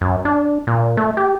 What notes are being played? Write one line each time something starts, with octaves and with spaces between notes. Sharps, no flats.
F#2
D4
A#2
A3
G4